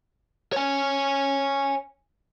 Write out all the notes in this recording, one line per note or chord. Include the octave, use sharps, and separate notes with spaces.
C#5 G#5